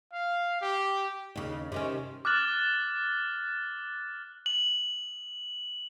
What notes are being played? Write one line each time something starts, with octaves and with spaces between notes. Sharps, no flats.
F5
G4
D#2 C#3
C3 D#3 C#4
D6 F6 F#6 A6 F#7
F#7